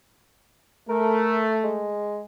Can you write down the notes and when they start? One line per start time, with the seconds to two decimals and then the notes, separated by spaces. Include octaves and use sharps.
0.89 A3 A#4
1.64 G#3